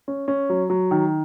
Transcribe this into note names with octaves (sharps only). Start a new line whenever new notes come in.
C#4
C#4
F#3
F#3
D#3